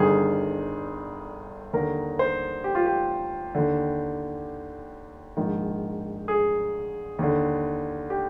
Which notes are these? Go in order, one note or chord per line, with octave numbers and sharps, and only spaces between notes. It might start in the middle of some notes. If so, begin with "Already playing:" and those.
Already playing: G1 G2 D#3 G#4
D#2 D3 A#4
C5
G4
F4
G4
D#2 D3
A#1 G#2 D#3
G#4
D#2 D3
G4